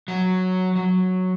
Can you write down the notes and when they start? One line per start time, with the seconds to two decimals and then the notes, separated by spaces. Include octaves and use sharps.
0.08 F#3
0.76 F#3